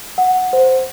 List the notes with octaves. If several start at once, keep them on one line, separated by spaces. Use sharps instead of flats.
F#5
C5